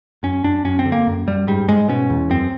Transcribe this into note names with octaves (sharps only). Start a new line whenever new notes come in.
F#2 C#4
F#2 D4
F#2 C#4
C4
D3
A#3
F#2
F#2 G3
G#2 G3
G#2 G#3
B2 C#4
E2
F#2 C4